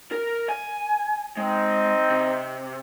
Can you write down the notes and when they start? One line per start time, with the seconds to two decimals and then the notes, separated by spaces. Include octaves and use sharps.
0.12 A#4
0.49 G#5
1.37 G#3 C4 D#4 G5
2.10 C3